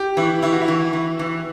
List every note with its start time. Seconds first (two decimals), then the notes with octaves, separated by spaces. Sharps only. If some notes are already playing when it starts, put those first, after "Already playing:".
Already playing: G4
0.17 E3 E4
0.42 E3 E4
0.52 F#4
0.62 E4
0.68 E3
0.93 E3
1.19 E3